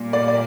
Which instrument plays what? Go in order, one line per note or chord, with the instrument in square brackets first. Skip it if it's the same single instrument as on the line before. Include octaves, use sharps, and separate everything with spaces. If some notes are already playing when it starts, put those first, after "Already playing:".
Already playing: [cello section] A#2 G3 A#3
[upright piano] D5
D5